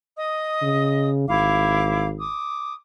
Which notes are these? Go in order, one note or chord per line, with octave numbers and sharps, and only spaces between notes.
D#5 D#6
C#3
G#1 E4 F5 D6
D6 D#6